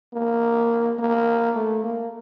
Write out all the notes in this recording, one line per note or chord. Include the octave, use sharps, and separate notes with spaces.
A#3
A#3
A3
A#3